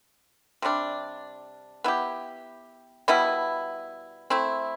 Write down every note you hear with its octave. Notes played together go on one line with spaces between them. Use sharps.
C3 G3 D4
B3 E4 G4
B2 G3 B3 E4
A3 C4 E4